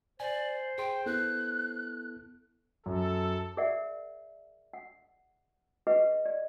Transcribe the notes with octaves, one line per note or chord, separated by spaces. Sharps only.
C5 D5 G#5
G#4 G5 C6
B3 E4 A4 F#6
F#2 A4
G#4 A#4 D5 E5 F#5
F#5
G#4 B4 D#5 F#5
D5